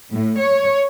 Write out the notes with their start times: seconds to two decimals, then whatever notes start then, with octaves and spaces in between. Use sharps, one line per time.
0.12 A2
0.42 C#5